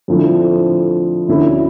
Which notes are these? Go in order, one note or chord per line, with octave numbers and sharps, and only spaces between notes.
F2 D3 F3 A3 E4
D2 D3 A3 C#4 E4